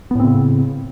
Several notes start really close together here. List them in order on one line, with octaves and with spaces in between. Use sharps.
B3 A2 C4 C#3